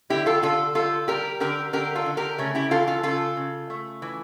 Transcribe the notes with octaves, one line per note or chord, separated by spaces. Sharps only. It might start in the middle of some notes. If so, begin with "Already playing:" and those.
D3 E4 G4
F4 A4
D3 F4 A4
G3 F4 A4
G3 G4 A#4
D3 G4 A#4
D3 G4 A#4
F4 A4
D3
G4 A#4
C#3 A3 C#4
E4 G4
E3 F4 A4
F4 A4
C#3 F4 A4
C#3
A3
E3